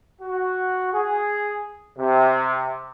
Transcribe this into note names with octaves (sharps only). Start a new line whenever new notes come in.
F#4
G#4
C3